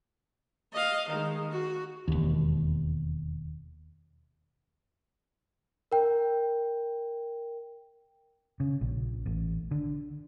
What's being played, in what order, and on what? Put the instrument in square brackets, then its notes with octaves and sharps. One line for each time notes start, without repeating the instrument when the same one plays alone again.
[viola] D#5 F5
D#3 G#3
F#4
[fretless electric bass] E1 D#2
[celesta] A#4 G5
[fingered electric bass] C#3
A#1
A1
D3